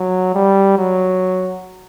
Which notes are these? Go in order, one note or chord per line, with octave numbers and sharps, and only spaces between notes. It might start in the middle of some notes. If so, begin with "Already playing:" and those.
Already playing: F#3
G3
F#3